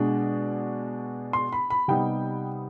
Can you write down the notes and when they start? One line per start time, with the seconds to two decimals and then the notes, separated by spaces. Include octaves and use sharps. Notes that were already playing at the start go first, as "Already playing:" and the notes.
Already playing: B2 G#3 D4
1.33 C6
1.52 B5
1.70 B5
1.88 C3 G3 B3 D#4 G5